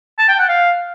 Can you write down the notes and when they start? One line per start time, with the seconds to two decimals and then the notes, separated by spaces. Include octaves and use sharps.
0.19 A5
0.29 G5
0.39 F#5
0.49 F5